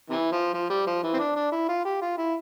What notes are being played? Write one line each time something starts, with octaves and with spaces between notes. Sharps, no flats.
C3 E3
F3
F3
G3
F3
E3
C4
D4
D4
E4
F4
G4
F4
E4